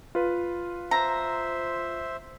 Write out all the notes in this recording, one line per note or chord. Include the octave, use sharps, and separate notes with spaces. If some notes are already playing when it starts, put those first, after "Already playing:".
F4 B4
C5 E5 A#5